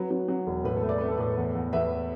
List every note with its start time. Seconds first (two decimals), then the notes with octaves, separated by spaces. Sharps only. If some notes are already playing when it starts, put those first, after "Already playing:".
Already playing: F#3 B4
0.11 F#3
0.28 F#3
0.46 E1
0.64 A2 B4
0.77 A4
0.83 A3
0.89 D5
0.98 A3 B4
1.08 A4
1.17 A2 B4
1.37 E2
1.55 E2
1.73 E2 B4 E5